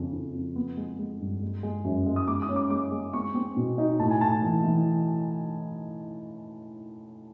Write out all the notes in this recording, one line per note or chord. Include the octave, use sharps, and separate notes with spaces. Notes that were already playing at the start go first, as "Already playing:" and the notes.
Already playing: F2 C#3
F2
F2
B3
G#3
G#3
G2
G#3
G#3
F#2
G#3
D#6
G#3 D6
D#6
C#4
D6
G#3 D6
G#3
C4 C#6
C4
B2
D#4
A2 A5
G#5
A2 A5
E3
E3